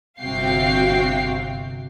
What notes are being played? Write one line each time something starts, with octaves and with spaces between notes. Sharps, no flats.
G1 C3 F#4 F5 G5 C7